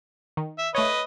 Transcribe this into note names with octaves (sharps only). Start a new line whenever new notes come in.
D#3
E5
A3 B4 C#5 D#5